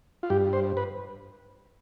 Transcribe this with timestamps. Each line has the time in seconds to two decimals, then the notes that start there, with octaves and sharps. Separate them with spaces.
0.23 F4
0.30 G2 G4
0.53 C5
0.77 B4